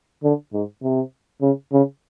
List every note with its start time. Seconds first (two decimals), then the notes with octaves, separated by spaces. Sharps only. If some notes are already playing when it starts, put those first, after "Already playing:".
0.23 D3
0.53 G#2
0.82 C3
1.41 C#3
1.72 C#3